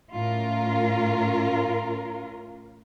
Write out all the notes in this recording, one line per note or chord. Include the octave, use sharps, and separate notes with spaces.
A2 C#4 F4 A#4